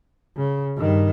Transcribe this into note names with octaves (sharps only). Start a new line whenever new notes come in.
C#3
G2 D#3